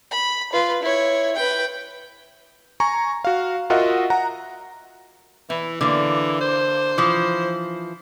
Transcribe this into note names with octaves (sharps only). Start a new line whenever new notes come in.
B5
F4 B4
E4 C#5
B4 G5
G#5 A#5 C#6
F#4 F5
F4 F#4 A#4 D#5 E5 F#5
F#5 A#5
E3 E4
D3 E3 A#3
C5
E3 F3